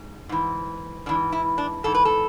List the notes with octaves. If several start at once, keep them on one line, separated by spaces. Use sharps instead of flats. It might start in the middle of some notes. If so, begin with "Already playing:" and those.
Already playing: G#2
G#2 E3
G#2 E3 D4
E4
D4
G#2 E3 A4
B4
A4